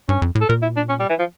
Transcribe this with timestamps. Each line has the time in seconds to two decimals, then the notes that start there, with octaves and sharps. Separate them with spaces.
0.09 G2 C#4
0.22 F2
0.35 A2
0.41 A4
0.49 A#2 A#4
0.62 E4
0.76 D4
0.89 C#4
0.99 G3
1.09 E3
1.19 F3